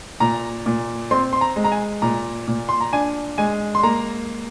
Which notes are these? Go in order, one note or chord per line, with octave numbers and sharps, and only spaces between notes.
A#2 A#5
A#2
C4 C6
C6
A#5
G#3
A#5
G#5
A#2 A#5
A#2
C6
A#5
D4 G#5
G#3 G#5
C6
A#3 A#5